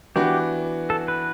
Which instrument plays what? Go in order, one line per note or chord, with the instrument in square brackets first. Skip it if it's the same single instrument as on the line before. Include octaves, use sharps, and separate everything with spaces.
[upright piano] E3 B3 D4 F#4 [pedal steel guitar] G4
[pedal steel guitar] A4
B4